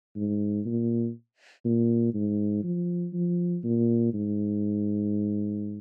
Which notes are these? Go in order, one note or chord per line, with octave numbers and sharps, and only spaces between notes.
G#2
A#2
A#2
G#2
F3
F3
A#2
G#2